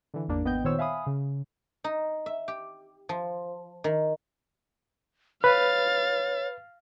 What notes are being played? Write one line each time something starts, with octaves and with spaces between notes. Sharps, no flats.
D3 E3
G#1 E2 A#3 D4
G#1 B3 D#5 G5 G6
A#2 D#3 B3 C5 C#5 E6
E5 F5 G#5 B5 D#6
C#3
D#4
E5
G4
F3
D#3
B4 C#5 F5 A6